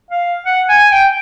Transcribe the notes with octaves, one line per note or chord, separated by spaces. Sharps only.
F5
F#5
G#5
G5